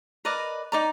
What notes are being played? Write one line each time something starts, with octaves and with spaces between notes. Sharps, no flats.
A#4 B4 D5 D#5
D#4 D5 A#5